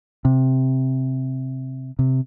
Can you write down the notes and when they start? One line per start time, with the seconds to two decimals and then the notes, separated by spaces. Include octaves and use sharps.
0.25 C3
1.99 C3